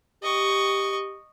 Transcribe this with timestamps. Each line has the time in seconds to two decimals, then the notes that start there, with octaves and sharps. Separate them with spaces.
0.23 G4 D#5 C#6